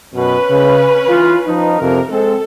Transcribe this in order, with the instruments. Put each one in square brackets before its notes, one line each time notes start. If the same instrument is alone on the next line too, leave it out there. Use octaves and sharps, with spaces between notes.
[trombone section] F#2 B2 [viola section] C#4 B4
[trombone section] C#3
E3 F4
F3 D#4
[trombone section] F2 C3 [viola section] A#4
[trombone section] G#3 C4 [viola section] A4